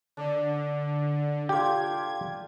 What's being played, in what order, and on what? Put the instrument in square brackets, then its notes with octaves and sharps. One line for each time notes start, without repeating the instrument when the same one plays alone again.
[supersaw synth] D3 [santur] D4
[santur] F4 A4 D6 [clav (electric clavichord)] G4 [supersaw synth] G#6